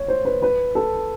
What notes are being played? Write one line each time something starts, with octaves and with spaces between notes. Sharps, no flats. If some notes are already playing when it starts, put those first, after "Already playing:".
Already playing: C#5
C5
B4
B4
A4